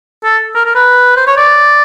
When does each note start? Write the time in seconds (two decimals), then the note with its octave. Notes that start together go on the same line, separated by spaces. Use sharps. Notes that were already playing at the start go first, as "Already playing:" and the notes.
0.24 A4
0.55 A#4
0.65 A#4
0.75 B4
1.17 C5
1.27 C#5
1.37 D5